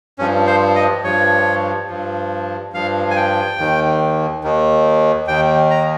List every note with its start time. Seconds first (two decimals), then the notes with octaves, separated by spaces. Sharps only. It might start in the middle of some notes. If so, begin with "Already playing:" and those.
0.18 G2 F3 C#4
0.47 C5
0.75 D#5
1.04 G2 F3 C#5
1.89 G2 F3
2.73 G2 F3 F5
3.10 G#5
3.16 G5
3.59 D#2 D#3
4.44 D#2 D#3
5.28 D#2 D#3 G5
5.71 A#5